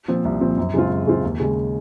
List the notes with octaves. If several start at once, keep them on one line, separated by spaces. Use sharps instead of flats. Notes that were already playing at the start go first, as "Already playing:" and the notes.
A#2 F3 C4
C2
A#2 F3 C4
F#2
C#3 G#3 C4 F4
F#2
C#3 G#3 C4 F4
D#2
C#3 G#3